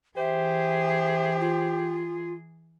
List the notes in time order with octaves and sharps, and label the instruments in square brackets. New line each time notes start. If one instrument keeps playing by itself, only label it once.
[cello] E3 G#4 [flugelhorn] G4 [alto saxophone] C5 [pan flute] E5
[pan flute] F4